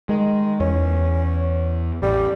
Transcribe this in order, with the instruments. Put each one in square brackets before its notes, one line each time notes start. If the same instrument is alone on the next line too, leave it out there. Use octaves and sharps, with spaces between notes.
[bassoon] D#3 [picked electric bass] G#3
[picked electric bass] E2 [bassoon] C#4
[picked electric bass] A1 [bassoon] G3